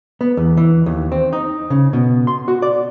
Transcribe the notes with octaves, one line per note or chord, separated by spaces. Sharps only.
B3
E2
E3
D#2
C4
D#4
C#3
B2
C6
F#4
D5